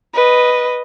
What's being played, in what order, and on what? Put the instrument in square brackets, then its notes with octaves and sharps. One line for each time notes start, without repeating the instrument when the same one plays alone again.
[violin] B4 D#5